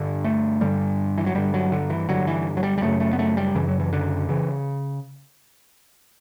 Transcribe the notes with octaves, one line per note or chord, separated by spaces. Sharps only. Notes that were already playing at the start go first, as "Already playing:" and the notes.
Already playing: G2 D3
A3
G2 D3 G3
E3
F#3
G2 D3 G3
F#3
D3
E3
G2 D3 F#3
E3
F#3
G3
G3
F#2 C#3 A3
A3
B3
A3
G3
F#2 C#3 E3
F#3
E3
D3
C#3 E3